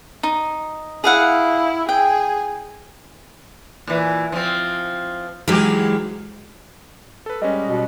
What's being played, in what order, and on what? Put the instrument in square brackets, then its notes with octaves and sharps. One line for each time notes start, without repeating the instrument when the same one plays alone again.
[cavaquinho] D#4
[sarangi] E4 [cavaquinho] G#4 F5 F#5
[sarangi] G#4 [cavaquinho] G5
[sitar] A#2 E3
F3 C4
[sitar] G#2 G4 [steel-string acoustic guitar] E3 F#3 G#3
[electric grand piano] A4 B4
[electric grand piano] G3 G#3 C#4 [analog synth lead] D#5
[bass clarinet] B2